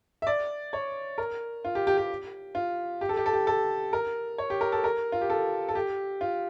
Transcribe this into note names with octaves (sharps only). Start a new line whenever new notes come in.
E5
D5
C#5
A#4
F4
G4
G4
G4
F4
G4
A4
G4
A4
G4
A4
A#4
C#5
G4
A#4
A4
A#4
F4
G4
A4
A4
G4
F4